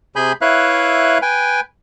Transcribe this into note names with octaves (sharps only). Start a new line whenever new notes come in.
C3 G#4 G#5 B5 G6
E4 B4 C#5 E5 F5 F#6
B4 G5 G#5